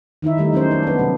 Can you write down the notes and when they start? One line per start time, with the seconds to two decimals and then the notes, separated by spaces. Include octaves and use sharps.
0.22 D#3 D#4 E4 E5
0.38 D#3 G3 A3 D#4
0.52 F#3 C#4 D#4 C5
0.71 D4
0.83 B3 D4
0.99 C3 F#3